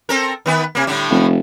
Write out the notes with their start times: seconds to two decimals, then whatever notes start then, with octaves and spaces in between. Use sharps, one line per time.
0.09 C4 A4 A#4
0.46 D#3 B3 B4
0.75 C3 A#3
0.87 A2 D3 G3
1.11 F1